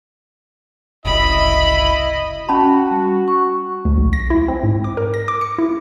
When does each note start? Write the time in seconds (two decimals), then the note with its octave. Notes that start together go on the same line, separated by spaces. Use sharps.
1.05 F#1 C2 E4 D#5 B5
2.49 C#4 F#4 A5 B5
2.91 G3
3.28 C#6
3.85 D2
3.98 B1
4.13 A#6
4.30 E4
4.48 C4
4.63 G#2
4.84 D6
4.97 A#4
5.14 A#6
5.28 D6
5.41 C#7
5.58 E4